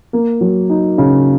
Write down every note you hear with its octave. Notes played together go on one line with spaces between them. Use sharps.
A#3
F#3
D#4
C#3